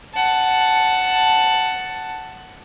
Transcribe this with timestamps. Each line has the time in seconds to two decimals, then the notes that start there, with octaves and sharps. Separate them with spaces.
0.14 F#5 A5